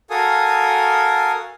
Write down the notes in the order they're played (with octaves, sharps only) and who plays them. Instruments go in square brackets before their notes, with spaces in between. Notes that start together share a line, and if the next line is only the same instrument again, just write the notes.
[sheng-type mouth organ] F#4 A4 A#4 F5 G#5 D#6